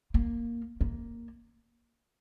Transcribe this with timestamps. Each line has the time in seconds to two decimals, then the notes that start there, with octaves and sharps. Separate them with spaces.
0.14 A#3
0.81 A#3